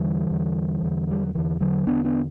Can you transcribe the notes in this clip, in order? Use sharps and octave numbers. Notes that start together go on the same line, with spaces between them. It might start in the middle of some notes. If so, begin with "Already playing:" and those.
Already playing: E2 D3 E3 G3
E2 D3
E2 D3
G3
F#3
E2 D3 E3
D3 F#3
E2 D3 B3 D4
B3 D4